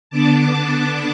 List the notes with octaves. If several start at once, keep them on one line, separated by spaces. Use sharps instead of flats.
D3 B3 D4 A5 D6